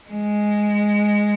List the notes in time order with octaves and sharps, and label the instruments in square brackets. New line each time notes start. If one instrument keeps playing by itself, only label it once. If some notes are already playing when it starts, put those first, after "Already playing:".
[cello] G#3